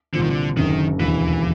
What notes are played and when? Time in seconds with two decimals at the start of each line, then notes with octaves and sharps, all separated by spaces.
0.14 C2 A#2 D3 F3
0.22 D#3
0.30 D3
0.56 F#1 F#2 D3 D#3
0.99 E1 D#2 D3 E3